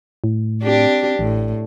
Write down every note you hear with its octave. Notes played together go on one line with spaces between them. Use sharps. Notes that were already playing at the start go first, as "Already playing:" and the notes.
A2
C4 D4 G4
A1 A2